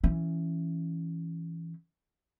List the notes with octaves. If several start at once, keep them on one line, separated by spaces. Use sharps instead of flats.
E3 C#4